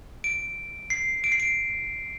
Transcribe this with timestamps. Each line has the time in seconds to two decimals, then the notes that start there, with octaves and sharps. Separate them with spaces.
0.24 D7
0.90 C7
1.24 D7
1.32 C7
1.40 D7